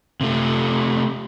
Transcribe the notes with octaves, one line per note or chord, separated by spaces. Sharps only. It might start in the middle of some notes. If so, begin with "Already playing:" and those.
C3 A3